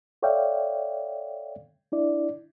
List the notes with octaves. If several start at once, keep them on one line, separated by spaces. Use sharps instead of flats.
A4 C#5 D5 E5 F5 G5
D4 E4 D5